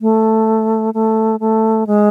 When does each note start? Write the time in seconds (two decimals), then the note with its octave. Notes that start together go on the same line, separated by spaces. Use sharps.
0.01 A3
0.94 A3
1.40 A3
1.87 G#3